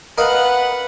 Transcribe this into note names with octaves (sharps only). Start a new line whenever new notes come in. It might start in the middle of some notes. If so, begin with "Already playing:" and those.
A#4 B4 D#5 F5 F#5